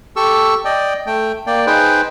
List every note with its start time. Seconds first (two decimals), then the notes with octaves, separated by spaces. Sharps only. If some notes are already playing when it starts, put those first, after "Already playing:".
0.16 G4 A4 C#6 E6
0.65 D5 D#5 G5
1.06 A3 G5
1.47 A#3 D5 G5
1.66 D#4 G#4 B4 C5 G5